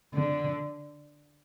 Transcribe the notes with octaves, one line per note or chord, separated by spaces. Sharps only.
D3